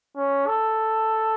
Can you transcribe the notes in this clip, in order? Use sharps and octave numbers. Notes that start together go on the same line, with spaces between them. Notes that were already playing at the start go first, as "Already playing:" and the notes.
C#4
A4